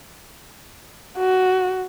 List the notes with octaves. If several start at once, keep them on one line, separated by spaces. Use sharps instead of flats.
F#4